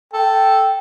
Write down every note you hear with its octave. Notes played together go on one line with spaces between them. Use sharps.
A4 G5